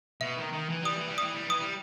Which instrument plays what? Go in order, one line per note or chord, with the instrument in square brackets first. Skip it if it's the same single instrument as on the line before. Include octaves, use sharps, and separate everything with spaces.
[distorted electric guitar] B2 [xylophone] E5
[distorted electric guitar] D#3
D#3
E3
[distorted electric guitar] G3 [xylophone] D#6
[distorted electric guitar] E3
G3
[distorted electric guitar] E3 [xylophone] D#6
[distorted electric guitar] G3
[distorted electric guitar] E3 [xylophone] D#6
[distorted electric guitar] G3